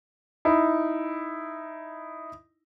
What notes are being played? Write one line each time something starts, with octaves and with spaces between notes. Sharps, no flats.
D#4 E4